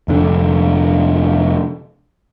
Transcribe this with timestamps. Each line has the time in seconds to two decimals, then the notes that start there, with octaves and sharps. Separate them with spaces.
0.08 F1 D3 D4